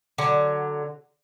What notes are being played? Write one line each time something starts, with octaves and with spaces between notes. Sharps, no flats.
D3 F#3